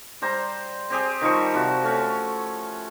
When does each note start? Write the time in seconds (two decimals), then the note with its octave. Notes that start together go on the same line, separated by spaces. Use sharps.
0.22 G3 C5 A#5
0.90 C4 G4 G#4
1.21 D#3 F3 G3 C#6
1.54 C3 F3 F#4
1.83 A3 C#4